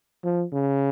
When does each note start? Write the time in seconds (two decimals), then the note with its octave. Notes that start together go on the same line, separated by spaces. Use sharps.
0.24 F3
0.53 C#3